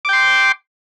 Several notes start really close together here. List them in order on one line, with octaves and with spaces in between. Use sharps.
D6 G5 C6